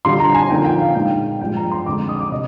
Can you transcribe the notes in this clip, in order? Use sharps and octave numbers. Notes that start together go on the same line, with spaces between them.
D3 G3 D4 F4 C6
A#5
G#5
D3 F3 A#3 D#4 G5
G5
F5
A#2 G#3 D#4 G5
G2 F3 G#3 G5
A#5
C6
F2 D3 G#3 D6
D#6
D6
C3 D#5